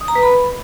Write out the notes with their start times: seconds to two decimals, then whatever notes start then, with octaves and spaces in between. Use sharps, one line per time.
0.01 D#6
0.08 A#5
0.15 B4
0.23 B5